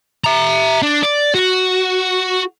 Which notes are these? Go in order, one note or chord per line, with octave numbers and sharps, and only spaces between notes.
E5 A#5
D4
D5
F#4